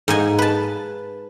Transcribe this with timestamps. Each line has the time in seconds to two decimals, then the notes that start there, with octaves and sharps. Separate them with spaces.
0.08 G#2 D#5 G#5
0.39 B4 A5